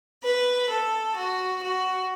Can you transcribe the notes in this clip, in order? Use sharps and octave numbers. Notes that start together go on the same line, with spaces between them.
B4
A4
F#4
F#4